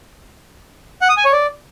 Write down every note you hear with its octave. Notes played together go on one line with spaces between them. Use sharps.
F#5
D#6
G#5
C#5
D5